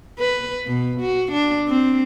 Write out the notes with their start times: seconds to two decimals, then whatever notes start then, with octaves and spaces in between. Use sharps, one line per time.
0.19 B4
0.66 B2
1.01 F#4
1.32 D4
1.68 C4